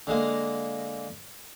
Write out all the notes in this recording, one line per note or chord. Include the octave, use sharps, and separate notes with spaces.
D3 G#3 A#3